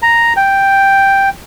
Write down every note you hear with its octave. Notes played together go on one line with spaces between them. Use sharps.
A#5
G5